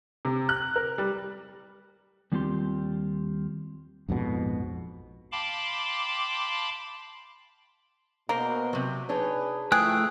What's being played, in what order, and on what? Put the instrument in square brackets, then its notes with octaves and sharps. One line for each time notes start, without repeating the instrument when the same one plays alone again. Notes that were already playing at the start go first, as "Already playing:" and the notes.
[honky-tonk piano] C3
F#6
A#4
G3
[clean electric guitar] D#2 G3 C4 F4 G4 C6
[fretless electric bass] A#1 F2 G#2 B2
[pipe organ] F5 G5 A5 B5 C6 D6
[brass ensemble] B2 [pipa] A#3 [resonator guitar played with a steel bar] A#4 C5
[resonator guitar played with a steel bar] C3 F#3
[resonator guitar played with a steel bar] D4 D#4 C#5 [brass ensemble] G#4 B4
[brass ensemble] C#3 F3 E4 [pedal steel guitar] A3 G5 F#6 [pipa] G#4